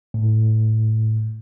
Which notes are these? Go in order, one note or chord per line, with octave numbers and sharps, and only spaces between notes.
A2